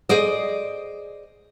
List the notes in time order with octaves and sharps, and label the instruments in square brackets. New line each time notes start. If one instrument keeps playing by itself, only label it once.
[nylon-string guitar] G#4 C5 D5 D#5